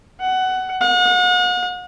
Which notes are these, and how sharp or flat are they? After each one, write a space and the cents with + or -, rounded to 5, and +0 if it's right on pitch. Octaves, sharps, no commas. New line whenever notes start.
F#5 +15
F#5 -40